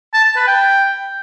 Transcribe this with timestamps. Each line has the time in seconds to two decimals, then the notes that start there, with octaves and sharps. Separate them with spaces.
0.14 A5
0.25 A5
0.36 B4
0.47 G5